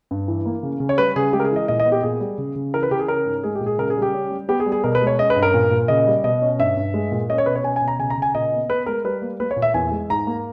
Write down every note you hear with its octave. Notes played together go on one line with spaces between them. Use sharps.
G2
E3
A#3
C#3
C#3
C#5
G3 B4
C#3 G#4
G#3 G4
A#4
G#4
E3
D#5
A#2 D#5
D#5
B3
G4
A#2 G#4
G3
C#3
C#3
E3 A#4
B4
C#3 G4
G#4
C#4 A#4
G#2
G#3 G#4
G4
A#2
G#4
C#3 A#4
G#4
G3
G4
C#4
G3
B3 G4
G#4
G3
G#4
B2 A#4
B4
G#3
C#5
C#4 D#5
B4
G2
A#4
A#2
A#2
C#3 D#5
G3
B2 D#5
C#4
G2 E5
G2
G#3
A#2
C#4 D#5
C#5
B2 B4
C#5
C#4 G#5
G#5
B2
A#5
C#3 G#5
A#5
C#3 G#5
A#2 D#5
B3
B3 B4
G#3 A#4
G3 B4
A#3
A#3 B4
C#5
A#2
E5
E2 G#5
G#3
G#2 A#5
A#3